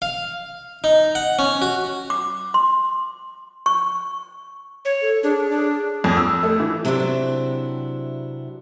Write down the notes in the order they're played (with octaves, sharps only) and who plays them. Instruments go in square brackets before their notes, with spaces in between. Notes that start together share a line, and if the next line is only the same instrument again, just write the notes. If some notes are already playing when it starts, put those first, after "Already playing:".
[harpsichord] F5
D#4
F#5
C#4
F#4
[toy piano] D6
C6
C#6
[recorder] C#5
[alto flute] A4
[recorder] D4 [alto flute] G#4
[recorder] D4
[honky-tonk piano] F2
E6
A3
E3
[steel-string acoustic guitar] C3 F#3 B3 C4 D4 E4